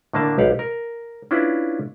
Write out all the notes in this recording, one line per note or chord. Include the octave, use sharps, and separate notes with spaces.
A2 D3 A#3 D4 A5
B1 G4 F5 F#5
A#4
C#4 D4 E4 F4 B4